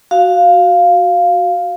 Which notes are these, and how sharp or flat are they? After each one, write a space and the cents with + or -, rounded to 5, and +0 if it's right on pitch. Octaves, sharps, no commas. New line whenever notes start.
F#4 +0 F5 +0